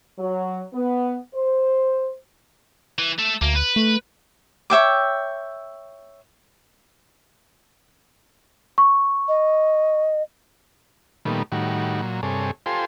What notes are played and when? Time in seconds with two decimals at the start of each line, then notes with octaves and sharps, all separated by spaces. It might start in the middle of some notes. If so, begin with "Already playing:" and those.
0.18 F#3
0.74 B3
1.35 C5
2.99 E3
3.19 A3 A4
3.42 D2 A#3
3.55 B4
3.76 A3
4.70 C#5 E5 G5 D6
8.78 C#6
9.28 D#5
11.25 A#2 D#3 G3 A3 B3
11.52 A2 D#3 G3 F#4
12.02 A#2 F#3
12.23 G2 C3 G#4 A4 C#5
12.66 F4 G4 A4 C5 G#5 C6